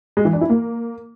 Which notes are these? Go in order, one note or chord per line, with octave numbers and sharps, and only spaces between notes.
G#3
E3
D4
E4
A#3